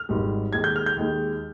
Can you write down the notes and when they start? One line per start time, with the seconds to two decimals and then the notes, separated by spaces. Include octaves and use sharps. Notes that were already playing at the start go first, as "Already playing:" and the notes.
Already playing: F6
0.09 G#1 G#2 G3
0.53 D#2 D#3 G#3 G#6
0.64 G6
0.76 F6
0.86 G6
0.96 D#2 D#3 G#3